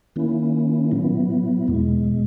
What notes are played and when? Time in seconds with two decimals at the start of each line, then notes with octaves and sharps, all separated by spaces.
0.16 D#3 A#3 C#4 E4
0.91 A#2 F#3 B3 E4
1.68 E2 B2 G#3